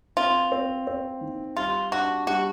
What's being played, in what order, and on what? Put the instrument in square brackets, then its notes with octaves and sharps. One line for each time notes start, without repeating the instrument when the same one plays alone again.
[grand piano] C4 [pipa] F4
[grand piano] C4
C4
D#3
[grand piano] G3 [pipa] F4
[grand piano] D4 [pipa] F#4
[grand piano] G3 [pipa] F#4